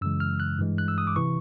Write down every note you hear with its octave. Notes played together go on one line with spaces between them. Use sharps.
F#2 C#3 E3 G#3 E6
F6
F#6
G2 E3 G#3
F#6
E6
D#6
D6
C3 E3 C#6